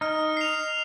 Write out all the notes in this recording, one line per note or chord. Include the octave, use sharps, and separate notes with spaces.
D#4 F6
C7 F7